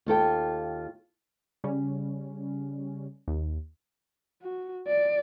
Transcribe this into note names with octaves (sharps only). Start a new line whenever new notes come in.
D#2 F4 A4 G5
C#3 G3 C#4
D#2
F#4
D5